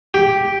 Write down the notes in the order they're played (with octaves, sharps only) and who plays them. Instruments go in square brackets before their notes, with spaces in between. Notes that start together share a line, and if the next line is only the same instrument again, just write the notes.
[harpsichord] G4